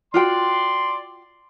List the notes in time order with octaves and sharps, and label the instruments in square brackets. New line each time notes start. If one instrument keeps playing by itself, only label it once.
[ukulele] F4 F#4 G5 [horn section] D5 C6